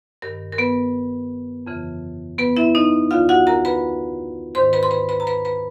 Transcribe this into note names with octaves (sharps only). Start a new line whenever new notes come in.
G2 D#3 A#4
A#4
B3 B4
F2 C#3 E3
B3 B4
E4 E5
D#4 D#5
D2 D3 F4 F5
F#4 F#5
A#4 A#5
B4 B5
G#2 D#3 C5 C6
B4 B5
C6
B4 B5
B4 B5
A#5
B4 B5
B4 B5